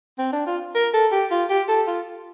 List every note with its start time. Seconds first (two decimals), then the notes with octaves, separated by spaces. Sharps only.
0.19 C4
0.32 D4
0.47 F4
0.75 A#4
0.94 A4
1.12 G4
1.31 F4
1.50 G4
1.69 A4
1.87 F4